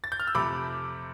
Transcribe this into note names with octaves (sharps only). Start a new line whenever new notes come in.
A6
G6
F6
E6
F2 C3 F3 A3 B5 D6